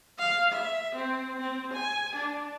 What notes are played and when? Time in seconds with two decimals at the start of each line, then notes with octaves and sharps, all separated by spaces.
0.18 F5
0.52 E5
0.95 C4
1.39 C4
1.73 G#5
2.15 D4